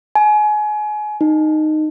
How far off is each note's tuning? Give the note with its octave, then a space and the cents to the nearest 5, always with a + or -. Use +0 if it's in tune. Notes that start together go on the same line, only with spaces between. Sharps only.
G#5 +30
D#4 -10